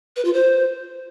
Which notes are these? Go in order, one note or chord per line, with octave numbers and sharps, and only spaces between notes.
B4
F4
C5